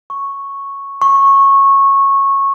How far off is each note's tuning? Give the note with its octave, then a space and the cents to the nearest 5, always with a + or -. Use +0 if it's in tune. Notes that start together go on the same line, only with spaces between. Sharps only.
C#6 -5
C#6 -15